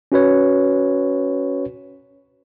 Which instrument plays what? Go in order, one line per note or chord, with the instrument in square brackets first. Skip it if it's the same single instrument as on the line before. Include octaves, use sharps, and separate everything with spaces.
[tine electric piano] C#4 F#4 B4 C#5